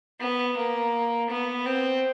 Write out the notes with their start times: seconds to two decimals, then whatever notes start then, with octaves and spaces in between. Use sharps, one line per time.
0.20 B3
0.57 A#3
1.29 B3
1.65 C4